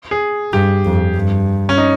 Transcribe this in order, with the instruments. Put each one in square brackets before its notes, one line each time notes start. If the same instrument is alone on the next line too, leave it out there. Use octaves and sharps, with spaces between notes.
[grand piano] G#4
[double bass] G2 [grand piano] G4
[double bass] F2
G2
[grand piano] C#4
D#4